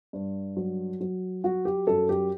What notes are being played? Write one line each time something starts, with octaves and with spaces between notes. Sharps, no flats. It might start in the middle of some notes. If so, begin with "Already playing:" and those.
G2
F#3
F#3
F#3 F#4
G4
F#2 A4
G4